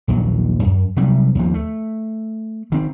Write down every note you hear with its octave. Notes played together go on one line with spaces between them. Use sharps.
A#1 D#2 F#3
F#2
C3 F#3 G3
D#2 F3
A3
D#3 C4